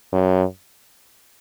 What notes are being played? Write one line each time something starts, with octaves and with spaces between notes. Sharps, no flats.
F#2